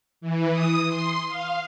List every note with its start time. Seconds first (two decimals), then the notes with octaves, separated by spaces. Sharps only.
0.21 E3
0.52 D#6
0.88 C6
1.28 F5